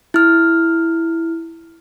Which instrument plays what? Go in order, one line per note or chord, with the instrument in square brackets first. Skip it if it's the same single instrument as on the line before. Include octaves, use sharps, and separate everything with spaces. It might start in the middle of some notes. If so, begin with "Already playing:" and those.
[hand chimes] E4 F6